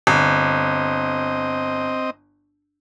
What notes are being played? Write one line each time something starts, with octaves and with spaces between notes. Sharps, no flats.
G1 C4 D#5